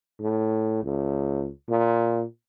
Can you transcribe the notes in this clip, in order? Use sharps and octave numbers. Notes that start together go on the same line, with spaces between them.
A2
C#2
A#2